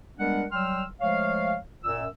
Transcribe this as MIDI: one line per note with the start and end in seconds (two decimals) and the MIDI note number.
0.19 0.44 55
0.19 0.44 56
0.19 0.44 59
0.19 0.44 62
0.19 0.44 70
0.19 0.44 78
0.52 0.84 54
0.52 0.84 55
0.52 0.84 79
0.52 0.84 84
0.52 0.84 88
0.52 0.84 89
1.01 1.56 53
1.01 1.56 56
1.01 1.56 57
1.01 1.56 73
1.01 1.56 77
1.84 2.06 42
1.84 2.06 46
1.84 2.06 88